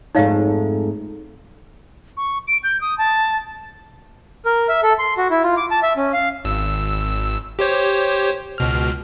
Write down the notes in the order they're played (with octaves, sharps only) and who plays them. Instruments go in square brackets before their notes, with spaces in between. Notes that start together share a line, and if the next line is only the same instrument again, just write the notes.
[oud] F2 G#2 A3 [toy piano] D#4 C#5 F5
[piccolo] C#6
D7
G6
D#6
A5
[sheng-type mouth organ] A#4
E5
A4
C6
F#4
E4
F4
D6
A5
E5
C#4
F5
[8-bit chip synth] G#1 E6
G4 C5 C#5
C#2 B2 F6